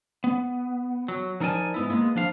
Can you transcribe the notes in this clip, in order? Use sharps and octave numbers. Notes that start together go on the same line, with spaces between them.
B3
F#3
F3 D#4 A#4 D5 G#5 A5
G#2 B3 E4
G#3 A#3 B3
F3 D4 F5